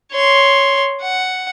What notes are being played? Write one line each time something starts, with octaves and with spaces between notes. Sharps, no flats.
C#5 C6
F#5